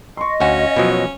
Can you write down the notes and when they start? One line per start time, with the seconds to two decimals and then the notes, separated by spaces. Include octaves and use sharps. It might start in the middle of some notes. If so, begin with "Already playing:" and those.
0.17 D#5 C6 C#6
0.40 D2 C#4 F#4 F5 F#5 G#5
0.77 B2 F3 F#3